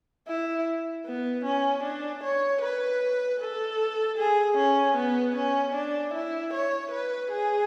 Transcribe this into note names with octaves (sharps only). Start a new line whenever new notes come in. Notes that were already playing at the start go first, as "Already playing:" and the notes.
E4
B3
C#4
D4
C#5
B4
A4
G#4
C#4
B3
C#4
D4
E4
C#5
B4
G#4